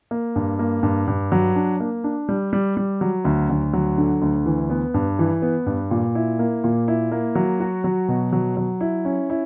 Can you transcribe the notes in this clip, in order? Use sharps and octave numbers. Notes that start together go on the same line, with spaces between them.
A#3
G2
A#3
G2
G2
F#3
D4
A#3
D4
G3
G3
G3
F#3
D2
D2
F#3
D3
D2
E3
B3
G2
E3
B3
G2
A#2
E4
A#3
A#2
E4
A#3
F#3
F#4
F#3
B2
F#3
F#3
E4
C#4
E4